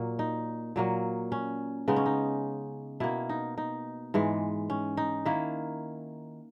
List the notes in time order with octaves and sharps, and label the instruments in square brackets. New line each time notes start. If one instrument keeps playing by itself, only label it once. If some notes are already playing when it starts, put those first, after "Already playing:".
Already playing: [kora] A#2 F#3 A#3
D#4
A#2 F#3 A#3
C#4
C#3 G#3 B3 D#4
C#4
D#4
B2 A#3 E4
D#4
D#4
G#2 E3 G#3
C#4
D#4
D#3 A#3 E4